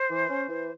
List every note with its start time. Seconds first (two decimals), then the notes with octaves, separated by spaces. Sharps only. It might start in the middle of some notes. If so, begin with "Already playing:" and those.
Already playing: C5
0.10 E3
0.29 C#4
0.48 E3